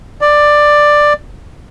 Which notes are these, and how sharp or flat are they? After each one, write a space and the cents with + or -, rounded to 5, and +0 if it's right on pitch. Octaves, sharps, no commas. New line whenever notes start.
D5 +10